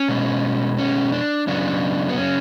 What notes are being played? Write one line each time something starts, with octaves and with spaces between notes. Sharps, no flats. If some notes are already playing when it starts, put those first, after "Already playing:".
Already playing: C#4
B2 G#3 B3
C#4
D4
F#2 C#3 F#3 B3 D4
B3
C#4